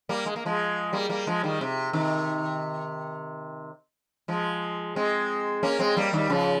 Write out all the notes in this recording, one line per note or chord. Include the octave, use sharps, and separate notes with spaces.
G3 A#3
G#3
A#3
F3 G#3
G3 A#3
G3 A#3
F3 G#3
D#3 G3
C3
C3 D#3
F3 G#3
G#3 C4
A#3 C#4
G#3 C4
G3 A#3
D#3 G3
C#3 F3